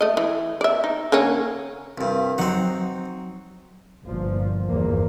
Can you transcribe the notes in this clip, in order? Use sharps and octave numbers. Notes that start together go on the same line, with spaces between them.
A3 D#5
E3
D5 E5
D#4
D3 A#3 C#4
C2 G2
F#3 C4 D#4 F#5
G1 A#2 F3
G1 E2 G2 F3 A#3